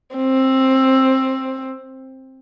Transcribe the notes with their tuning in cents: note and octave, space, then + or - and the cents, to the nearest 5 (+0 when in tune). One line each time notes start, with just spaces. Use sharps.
C4 +15